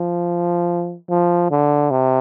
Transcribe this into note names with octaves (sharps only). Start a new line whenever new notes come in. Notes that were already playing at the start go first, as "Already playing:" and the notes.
Already playing: F3
F3
D3
C3